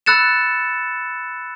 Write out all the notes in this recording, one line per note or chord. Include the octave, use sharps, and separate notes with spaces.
B5 E6 F#6 A6 C#7 E7